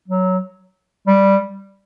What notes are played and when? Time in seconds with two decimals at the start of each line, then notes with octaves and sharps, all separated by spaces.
0.08 F#3
1.07 G3